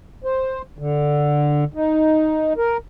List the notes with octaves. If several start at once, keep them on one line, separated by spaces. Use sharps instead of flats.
C5
D3
D#4
A#4